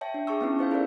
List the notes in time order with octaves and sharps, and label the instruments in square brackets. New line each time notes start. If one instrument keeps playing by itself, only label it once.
[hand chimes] C#5 E5 G5 A5
D4
G#4 A5 C#6 E6
B3 C#4 E4
D#4 C5 F5 G6
E4 A4 A#4 D5